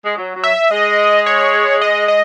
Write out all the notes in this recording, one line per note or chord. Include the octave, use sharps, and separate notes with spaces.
G#3
F#3
F#3
E5
G#3 D#5
C#5
D#5
D#5